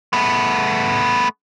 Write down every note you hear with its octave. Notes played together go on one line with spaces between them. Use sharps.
A3 B3